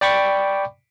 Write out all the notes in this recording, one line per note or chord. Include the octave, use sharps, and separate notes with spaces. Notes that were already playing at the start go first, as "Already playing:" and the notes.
D5 G5 B5 C#6 D6